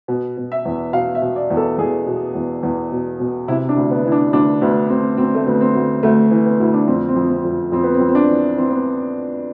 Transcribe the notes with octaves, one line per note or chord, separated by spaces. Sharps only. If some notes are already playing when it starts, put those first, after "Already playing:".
B2
B2
E5
E2
B2 F5
E5
B2
D5
E2
A4
E2 G#4
B2
E2
E2
B2
B2
C3 E4
D4
D2
B3
E3 E4
D4
D2 D4
D2 B3
D2 C4
D2 C4
A3
D2 B3
C4
D2
D2 A3
E3
B3
D2 E4
D4
F2 C4
C4
F2
C4
F2
F2 C4
B3
C4
F2
C4
D4
E3
E3 C4
B3